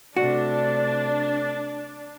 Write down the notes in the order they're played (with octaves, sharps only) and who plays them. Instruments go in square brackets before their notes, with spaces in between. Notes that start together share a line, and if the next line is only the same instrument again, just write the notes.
[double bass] C3 A3 [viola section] D4 [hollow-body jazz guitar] F#4 [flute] D5